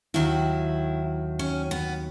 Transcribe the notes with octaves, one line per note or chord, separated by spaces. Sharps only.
D#2 D#3 F#3 E4
C#4
B3